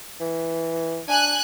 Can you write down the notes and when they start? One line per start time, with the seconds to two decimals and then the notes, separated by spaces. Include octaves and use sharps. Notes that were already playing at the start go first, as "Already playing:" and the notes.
0.20 E3
1.08 D4 G#5 F#6